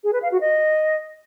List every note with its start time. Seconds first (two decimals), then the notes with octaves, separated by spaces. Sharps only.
0.04 G#4
0.13 B4
0.22 F5
0.32 F#4
0.41 D#5